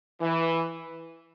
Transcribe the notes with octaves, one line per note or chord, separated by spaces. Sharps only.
E3